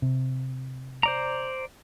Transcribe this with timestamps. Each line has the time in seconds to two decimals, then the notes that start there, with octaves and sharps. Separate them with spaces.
0.02 C3
1.03 C5 D5 A#5